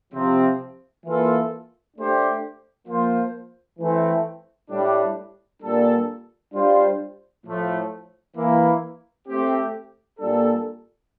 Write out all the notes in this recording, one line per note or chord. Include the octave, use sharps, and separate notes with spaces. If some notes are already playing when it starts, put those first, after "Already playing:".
C3 F3 C4
E3 A#3 F4 A4
A3 D4 G4 C5
F3 A#3 F4 C5
E3 A3 C4
A2 G3 D4
A#2 G3 A#3 D4 A4
G3 D4 F4 C5
A2 F3 A3
E3 A#3 E4
A3 C4 G4
A#2 G3 A#3 D4 A4